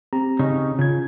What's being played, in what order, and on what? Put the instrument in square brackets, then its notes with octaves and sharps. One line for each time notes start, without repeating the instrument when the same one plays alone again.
[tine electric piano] C4 G4 A#5
[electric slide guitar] C#3 C#4 D#4
[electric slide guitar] C#3 [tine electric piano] F4 G#6